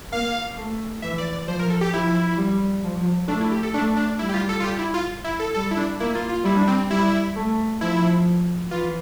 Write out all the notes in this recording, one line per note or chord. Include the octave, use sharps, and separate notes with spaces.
A#3 F5
A3
E3 E5
D5
D5
F3 C5
A#4
A4
G4
F3 E4
G3
F3
A3 D4
E4
G4
A4
A3 D4
D4
G3 E4
G4
F4
A4
F4
G4
E4
F4
E4
A4
G3 A4
E4
D4
A#3 E4
F4
F4
G3 E4
D4
C4
G3 E4
A3
F3 E4
E3 F4